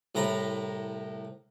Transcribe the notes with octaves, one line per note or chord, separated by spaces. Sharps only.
C2 A2 A#5 B5